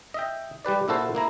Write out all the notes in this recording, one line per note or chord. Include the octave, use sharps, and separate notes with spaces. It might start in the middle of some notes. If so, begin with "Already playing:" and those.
D#5 E5 G5
G3 G4 B4 D5
A#2 E4 F#4 A4 C5
A#3 E4 A#5